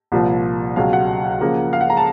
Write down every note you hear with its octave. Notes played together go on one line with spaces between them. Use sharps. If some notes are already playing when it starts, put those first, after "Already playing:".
C2 A#2 F3 A#3
C#2 B2 F#3 F5
F#5
C#3 F3 A#3
F5
F#5
A#5
A5